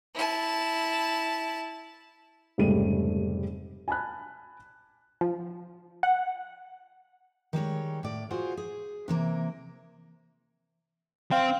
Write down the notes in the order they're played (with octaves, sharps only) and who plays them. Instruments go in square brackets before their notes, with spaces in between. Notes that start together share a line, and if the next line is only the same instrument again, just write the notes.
[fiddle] E4 A5
[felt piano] F1 G#2 C#3 G3 A3 D#7
G#5 A5 B5 F#6
[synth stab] F3
F#5
[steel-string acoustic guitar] D#3 G3 G#3 C#5
A2 D5
F4 F#4 G#4 C5 F#5
G#4
C3 E3 A#3
[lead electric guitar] C4 C5 [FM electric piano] F5 G5